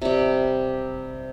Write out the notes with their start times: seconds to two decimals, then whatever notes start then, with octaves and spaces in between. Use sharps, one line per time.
0.02 C3 G3